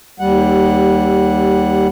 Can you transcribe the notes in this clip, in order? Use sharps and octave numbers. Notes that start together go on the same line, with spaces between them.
D#2 G3 F#5